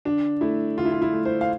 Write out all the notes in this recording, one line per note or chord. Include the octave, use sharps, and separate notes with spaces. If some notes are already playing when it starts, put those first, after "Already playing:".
D3 D4
A3 E4
D3 F4
E4
F4
E4
A3
C5
F5